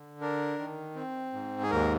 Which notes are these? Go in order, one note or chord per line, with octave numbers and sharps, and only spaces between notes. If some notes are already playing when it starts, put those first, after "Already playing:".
Already playing: D3
D4 A#4
D#3
C4
G#2
G#4
D#2 A#4